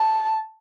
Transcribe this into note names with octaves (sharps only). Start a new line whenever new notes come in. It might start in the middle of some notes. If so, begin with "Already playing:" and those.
Already playing: A5